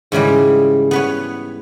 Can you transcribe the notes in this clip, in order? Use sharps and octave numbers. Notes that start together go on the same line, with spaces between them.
G#2 C#3 E3 G3
B3 B4 C#5